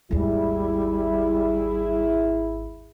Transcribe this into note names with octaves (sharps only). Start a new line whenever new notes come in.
G#1 D#2 G3 E4 G#4